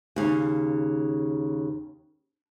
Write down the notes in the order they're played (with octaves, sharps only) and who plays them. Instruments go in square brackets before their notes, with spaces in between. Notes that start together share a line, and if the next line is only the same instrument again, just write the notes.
[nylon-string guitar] D#2 C#3